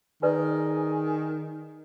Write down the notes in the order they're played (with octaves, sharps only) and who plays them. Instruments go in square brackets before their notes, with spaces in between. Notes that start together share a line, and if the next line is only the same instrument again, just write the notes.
[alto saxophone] D#3 [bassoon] G#4 [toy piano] A#4 B4 D5